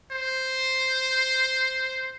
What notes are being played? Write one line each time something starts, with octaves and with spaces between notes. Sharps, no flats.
C5